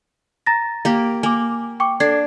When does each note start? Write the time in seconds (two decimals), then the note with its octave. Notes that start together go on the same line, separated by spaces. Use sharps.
0.46 A#5 A6 A#6
0.85 A#3 G4
1.23 A#3 G#5 D6
1.80 G5 C#6 D6
2.00 D4 A4 G#6 C7